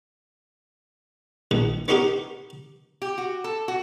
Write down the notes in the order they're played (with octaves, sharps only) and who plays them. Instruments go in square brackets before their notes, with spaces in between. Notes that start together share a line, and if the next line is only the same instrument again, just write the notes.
[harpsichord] A#1 D#3
B3 C#4 D#4 F#4 G4 A#4
[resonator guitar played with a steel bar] G4
F#4
A4
F#4